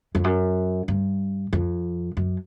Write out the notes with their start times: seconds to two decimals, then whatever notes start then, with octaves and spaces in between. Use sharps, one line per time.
0.15 F2
0.24 F#2
0.88 G2
1.53 F2
2.17 F#2